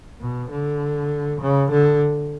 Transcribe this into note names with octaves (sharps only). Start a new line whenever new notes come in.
B2
D3
C#3
D3